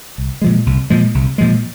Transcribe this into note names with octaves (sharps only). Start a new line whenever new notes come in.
C2
A#2 F3 G#3
C2
A#2 F3 G#3
C2
A#2 F3 G#3